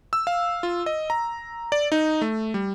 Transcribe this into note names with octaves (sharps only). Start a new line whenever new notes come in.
E6
F5
F4
D#5
A#5
D5
D#4
A3
G3